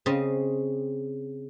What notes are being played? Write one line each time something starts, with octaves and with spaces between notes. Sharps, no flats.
C#3 C4 D#5